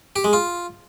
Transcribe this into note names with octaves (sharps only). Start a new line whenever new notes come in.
G4
G#3
F4